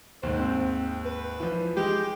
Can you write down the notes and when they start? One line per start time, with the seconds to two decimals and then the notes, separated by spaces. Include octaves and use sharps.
0.23 D#2 G#2 C5
0.40 C4
1.05 B4
1.40 E3 F3
1.77 G#3 G4